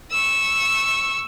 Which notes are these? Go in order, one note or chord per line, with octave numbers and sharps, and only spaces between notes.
C#6 E6